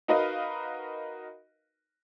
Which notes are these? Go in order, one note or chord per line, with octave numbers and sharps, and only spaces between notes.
D#4 F#4 A#4 B4 D#5 F5